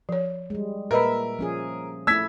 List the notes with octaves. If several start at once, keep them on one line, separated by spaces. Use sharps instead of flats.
F3 C#5
G3 G#3
A#2 A#4 B4 D#5 E5 B5
F3 C#4 G#4
A3 E4 E6 G#6 B6